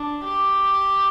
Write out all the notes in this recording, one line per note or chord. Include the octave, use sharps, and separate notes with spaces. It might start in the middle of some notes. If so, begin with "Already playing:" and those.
Already playing: D4
G4